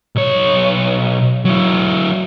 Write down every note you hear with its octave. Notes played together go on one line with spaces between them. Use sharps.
B1 C#5
F#3 E4